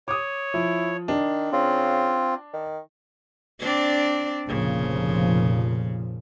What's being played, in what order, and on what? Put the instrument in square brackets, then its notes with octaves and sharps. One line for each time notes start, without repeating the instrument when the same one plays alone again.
[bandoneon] C#5 [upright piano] D6 D#6
[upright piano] F3 [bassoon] E4
[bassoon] D#3 [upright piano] D4
[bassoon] C#3 [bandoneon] C4 F4
[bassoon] D#3
[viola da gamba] C4 D4 D5
[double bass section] F1 A#2 F3 [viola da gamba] C#3